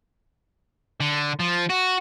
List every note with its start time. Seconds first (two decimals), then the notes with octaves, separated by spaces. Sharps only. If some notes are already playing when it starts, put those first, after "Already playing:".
1.00 D3
1.40 F3
1.70 F#4